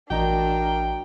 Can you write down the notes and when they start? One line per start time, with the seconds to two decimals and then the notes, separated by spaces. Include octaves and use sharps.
0.11 A1 D4 F#4 A#4 D#5 G5 A#5